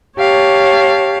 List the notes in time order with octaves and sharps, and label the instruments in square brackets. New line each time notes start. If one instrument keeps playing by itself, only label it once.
[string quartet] G4 C#5 F5 A5